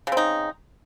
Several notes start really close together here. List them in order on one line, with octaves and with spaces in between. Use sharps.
C#3 C4 D#4